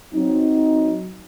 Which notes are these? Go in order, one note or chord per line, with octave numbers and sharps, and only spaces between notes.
F#3 C4 D#4